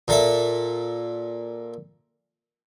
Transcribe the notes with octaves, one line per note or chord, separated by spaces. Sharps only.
A#2 A4 E5